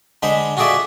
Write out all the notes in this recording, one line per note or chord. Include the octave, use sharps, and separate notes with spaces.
D3 G#3 C5 B5
F4 F#4 G#4 A4 D5 E5